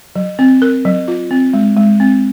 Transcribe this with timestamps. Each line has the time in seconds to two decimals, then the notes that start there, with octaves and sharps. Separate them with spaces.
0.16 F#3
0.39 C4
0.62 A#4
0.85 F#3
1.08 F4
1.31 C4
1.54 G#3
1.77 G#3
2.00 C4